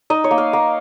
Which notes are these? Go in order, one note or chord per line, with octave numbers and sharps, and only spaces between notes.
D#4 D#5
C#5
A#3
F5
A#3